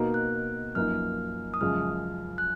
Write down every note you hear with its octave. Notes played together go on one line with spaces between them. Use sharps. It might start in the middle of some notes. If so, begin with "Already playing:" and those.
Already playing: B2 A#3 D#4 F#4 A#4
F#6
F#2 F3 A#3 D#4 F6
D#6
F#2 C#3 F3 G#3 F6
F#6